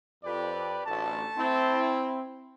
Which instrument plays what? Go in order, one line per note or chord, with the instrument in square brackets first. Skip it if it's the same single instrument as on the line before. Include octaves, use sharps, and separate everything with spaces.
[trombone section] F2 [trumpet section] G4 B4 D5
[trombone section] A1 D2 [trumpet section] A3 A5
[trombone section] C4 E4